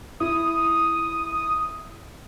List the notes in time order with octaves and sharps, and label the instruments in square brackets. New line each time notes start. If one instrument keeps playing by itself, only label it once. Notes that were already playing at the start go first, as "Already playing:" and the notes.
[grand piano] E4 [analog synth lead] D#6